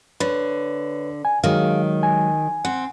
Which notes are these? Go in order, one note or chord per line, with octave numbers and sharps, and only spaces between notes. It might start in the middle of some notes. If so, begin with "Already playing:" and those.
D3 B4 C#5
G#5
D#3 F#3 G#3 G#4 F5
G#5
C4 F#5